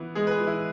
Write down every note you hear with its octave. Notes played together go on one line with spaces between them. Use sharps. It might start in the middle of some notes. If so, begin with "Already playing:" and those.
Already playing: E3 B3
G#3 G#4
B4
G#4
E3
E4